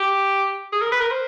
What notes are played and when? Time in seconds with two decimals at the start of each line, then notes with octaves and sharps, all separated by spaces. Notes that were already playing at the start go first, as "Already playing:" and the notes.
Already playing: G4
0.72 G#4
0.81 A#4
0.92 B4
1.01 A#4
1.11 C5